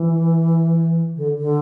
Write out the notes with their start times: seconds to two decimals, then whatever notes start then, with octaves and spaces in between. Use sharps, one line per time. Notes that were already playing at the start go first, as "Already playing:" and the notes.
Already playing: E3
1.16 D3
1.39 D3